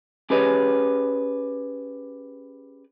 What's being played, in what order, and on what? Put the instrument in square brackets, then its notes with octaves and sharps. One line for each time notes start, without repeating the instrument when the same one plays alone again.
[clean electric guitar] C#4 G4 G#4 B4 C#5 D#5